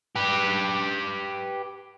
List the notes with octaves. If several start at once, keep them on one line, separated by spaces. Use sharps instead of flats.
G4 B4